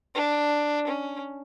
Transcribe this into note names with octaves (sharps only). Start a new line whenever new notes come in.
D4
C#4